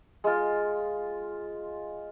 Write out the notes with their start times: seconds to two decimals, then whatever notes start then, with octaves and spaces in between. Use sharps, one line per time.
0.24 G#3 F4